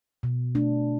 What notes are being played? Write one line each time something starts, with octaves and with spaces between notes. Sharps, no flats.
B2
A3 D4